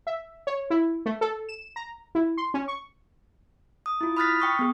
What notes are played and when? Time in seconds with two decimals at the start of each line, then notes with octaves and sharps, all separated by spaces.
0.07 E5
0.47 C#5
0.70 E4
1.06 A3
1.21 A4
1.49 E7
1.76 A#5
2.15 E4
2.37 C6
2.54 C#4
2.68 C#6
3.86 D#6
4.01 E4 F4
4.17 B5 D#6 F6 F#6 A6 B6
4.40 G5 C#6 D#6
4.59 B3 G#4